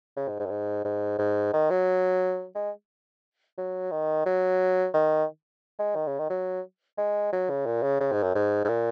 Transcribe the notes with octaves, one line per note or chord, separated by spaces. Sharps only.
C#3
G#2
G#2
F#2
G#2
G#2
G#2
D#3
F#3
G#3
F#3
D#3
F#3
D#3
G#3
D#3
C#3
D#3
F#3
G#3
F#3
C#3
A#2
C#3
C#3
G#2
F#2
G#2
G#2
A#2